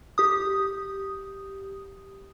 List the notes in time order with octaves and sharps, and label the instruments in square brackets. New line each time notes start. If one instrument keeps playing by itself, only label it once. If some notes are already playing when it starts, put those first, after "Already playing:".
[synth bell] G4 D#6